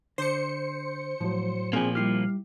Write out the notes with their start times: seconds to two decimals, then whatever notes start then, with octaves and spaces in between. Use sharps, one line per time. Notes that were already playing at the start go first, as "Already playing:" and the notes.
0.18 D3 C5 C#7
1.20 A2 F3 F#3
1.73 A#2 F3 A#3 C4 G#4 G#5
1.95 G3 E4 G4 F6 C7